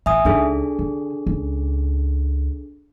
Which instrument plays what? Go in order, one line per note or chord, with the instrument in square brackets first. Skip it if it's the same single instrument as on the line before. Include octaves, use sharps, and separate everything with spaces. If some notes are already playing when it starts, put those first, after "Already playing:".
[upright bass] A1 [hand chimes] E5 G#5 D#6
[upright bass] C#2 D#4 [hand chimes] D4 G#4 A4
[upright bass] D3
C#2